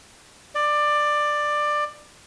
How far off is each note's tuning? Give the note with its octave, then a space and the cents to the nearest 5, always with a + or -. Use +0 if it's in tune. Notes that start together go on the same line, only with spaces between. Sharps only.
D5 +15